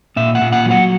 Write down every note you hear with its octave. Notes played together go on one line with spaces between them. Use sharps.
A#2 E5
F#5
A#2
F#5
F#3
F#5